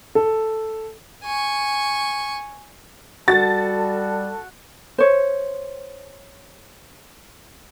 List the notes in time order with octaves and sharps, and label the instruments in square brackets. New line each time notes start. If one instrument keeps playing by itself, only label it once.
[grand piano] A4
[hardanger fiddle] G#5 C#6
[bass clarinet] G3 [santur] F#4 [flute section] A4 A5 [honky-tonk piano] A6
[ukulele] C5 C#5